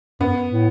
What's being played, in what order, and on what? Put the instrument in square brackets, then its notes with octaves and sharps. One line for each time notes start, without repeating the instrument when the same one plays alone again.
[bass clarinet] F#2 [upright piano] B3
[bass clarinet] A2